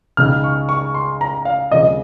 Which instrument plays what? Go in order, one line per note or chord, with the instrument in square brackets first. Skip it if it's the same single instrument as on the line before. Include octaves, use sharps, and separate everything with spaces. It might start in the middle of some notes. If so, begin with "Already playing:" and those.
[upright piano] C#2 C#3 G#3 D#4 [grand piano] F6
[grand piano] C#6
C#6
C6
A#5
F5
[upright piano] D#2 C#3 F3 G#3 C4 [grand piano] D#5